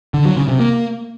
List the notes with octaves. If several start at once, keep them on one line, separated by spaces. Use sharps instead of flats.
D3
F#3
C#3
C3
A#3